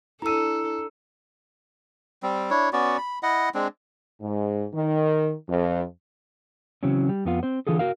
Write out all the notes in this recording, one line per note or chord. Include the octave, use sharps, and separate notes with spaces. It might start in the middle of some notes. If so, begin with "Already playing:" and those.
D4 E4 A4 A#5 E6 D#7
G3 C4
D4 E4 C#5
B3 C#4 F#4 D5
B5
E4 D#5 F#5
G#3 C4 D4
G#2
D#3
F2
C#3 E3 F#3 C4 C#4
G3
F2 B3 F4
C4 C5
D3 E3 F4 G#4 A4
F#4 A#4 F5